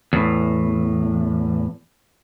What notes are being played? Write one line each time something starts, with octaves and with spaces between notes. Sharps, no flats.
E2 A2